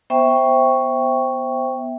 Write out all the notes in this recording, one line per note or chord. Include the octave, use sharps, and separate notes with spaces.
B3 C5 E5 G5 C#6